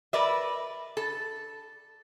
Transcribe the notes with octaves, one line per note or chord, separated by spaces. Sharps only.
A#4 B4 D5 E5
A4